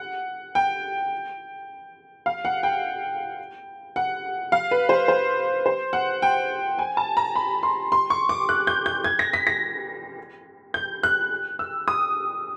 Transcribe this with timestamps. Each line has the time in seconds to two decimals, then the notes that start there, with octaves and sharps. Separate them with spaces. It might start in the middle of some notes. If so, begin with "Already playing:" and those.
Already playing: F#5
0.55 G5
2.26 F5
2.45 F#5
2.63 G5
3.96 F#5
4.52 F5
4.71 B4
4.89 C5
5.08 C5
5.66 C5
5.93 F#5
6.22 G5
6.79 G#5
6.97 A5
7.17 A#5
7.36 B5
7.63 C6
7.92 C6
8.10 C#6
8.29 D6
8.49 F#6
8.67 G6
8.86 G6
9.04 G#6
9.19 A#6
9.33 B6
9.47 A#6
10.74 G6
11.03 F#6
11.59 E6
11.88 D#6